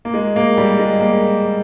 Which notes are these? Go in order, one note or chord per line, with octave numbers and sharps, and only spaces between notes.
A#3
G#3
A#3
G3
G#3
A#3